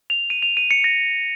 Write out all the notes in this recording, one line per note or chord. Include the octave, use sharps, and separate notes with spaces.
F7
D#7
F7
D#7
C#7
A#6